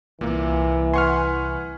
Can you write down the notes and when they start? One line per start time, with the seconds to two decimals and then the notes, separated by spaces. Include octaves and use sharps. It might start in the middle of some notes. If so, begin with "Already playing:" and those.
0.21 C2 A#2 E3 A#3
0.94 B4 F#5 G#5 C6 C#6 F6